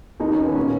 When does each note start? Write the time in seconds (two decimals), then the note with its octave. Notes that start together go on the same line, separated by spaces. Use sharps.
0.20 D#2 D#3 D#4
0.33 C#4
0.44 B3
0.56 A#2 C#4